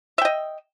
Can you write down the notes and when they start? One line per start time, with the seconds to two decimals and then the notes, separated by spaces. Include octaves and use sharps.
0.18 E5
0.22 G5
0.25 D#5